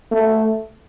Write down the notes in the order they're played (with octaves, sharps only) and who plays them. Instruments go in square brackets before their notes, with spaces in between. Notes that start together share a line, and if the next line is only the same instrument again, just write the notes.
[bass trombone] A3